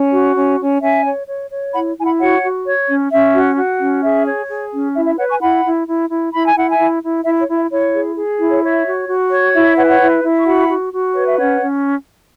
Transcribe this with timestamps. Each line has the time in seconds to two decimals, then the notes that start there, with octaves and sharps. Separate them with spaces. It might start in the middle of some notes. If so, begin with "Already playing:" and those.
Already playing: C#4
0.13 F#4
0.36 C#4
0.60 C#4
0.82 C#4 E5 G#5
1.05 C#5
1.27 C#5
1.51 C#5
1.74 E4 F#5 B5
1.97 E4 G#5
2.05 F#5 B5
2.20 F#4 C#5 F#5
2.43 F#4
2.66 C#5
2.89 C#4
3.11 C#4 E5
3.35 F#4
3.57 F#4
3.80 C#4
4.03 G#4 E5
4.26 C#5
4.50 G#4
4.73 C#4
4.96 E4 E5
5.06 E5
5.18 B4 C#5 F#5
5.29 G#5 C#6
5.41 E4 F#5 B5
5.64 E4
5.87 E4
6.10 E4
6.34 E4 B5
6.45 G#5
6.56 E4 F#5
6.71 E5 G#5
6.79 E4
7.03 E4
7.24 E4 E5
7.40 C#5
7.48 E4
7.56 E5
7.71 E4 C#5
7.93 G#4
8.16 G#4
8.40 E4
8.51 C#5
8.62 C#5 E5
8.86 F#4
9.09 F#4
9.32 C#5
9.54 E4 E5
9.67 E5
9.78 B4 C#5 F#5
9.84 G#5
9.89 C#5 F#5
10.00 E4
10.24 E4
10.39 C#6
10.46 F#4 F#5 B5
10.69 F#4
10.92 F#4
11.14 B4 C#5
11.27 E5
11.38 C#4 C#5 F#5
11.61 C#4